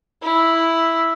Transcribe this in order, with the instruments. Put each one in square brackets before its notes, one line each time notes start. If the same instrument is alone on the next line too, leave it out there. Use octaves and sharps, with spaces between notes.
[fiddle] E4